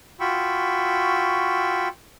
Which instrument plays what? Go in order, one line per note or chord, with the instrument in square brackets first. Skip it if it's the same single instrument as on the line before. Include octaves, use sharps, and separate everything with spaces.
[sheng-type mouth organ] F4 F#4 G5 B5 C#6 E6